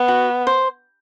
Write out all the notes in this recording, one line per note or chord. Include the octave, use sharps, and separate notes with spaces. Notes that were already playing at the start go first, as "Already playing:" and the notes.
Already playing: B3
F#4
C5